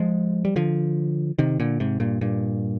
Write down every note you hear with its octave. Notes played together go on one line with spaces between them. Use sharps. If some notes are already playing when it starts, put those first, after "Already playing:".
Already playing: F3 G#3
G3
D3 F3
C3 D#3
A#2 D3
G#2 C3
G2 A#2
G2 A#2